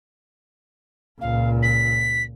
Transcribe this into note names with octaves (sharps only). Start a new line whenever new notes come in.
C#2 A#2 F5
B6